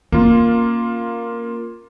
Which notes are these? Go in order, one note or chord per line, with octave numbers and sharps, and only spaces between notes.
A#3 C#4 F4